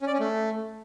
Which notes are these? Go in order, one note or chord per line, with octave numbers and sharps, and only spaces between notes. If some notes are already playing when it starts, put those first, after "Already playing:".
C#4
D5
C#4
A3